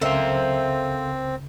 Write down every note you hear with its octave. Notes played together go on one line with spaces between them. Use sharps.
C#2 C#3 C4 A4 A#4 C5 E5 F5